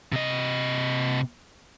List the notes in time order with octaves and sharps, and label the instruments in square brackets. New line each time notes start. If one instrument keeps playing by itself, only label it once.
[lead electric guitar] C3 D#5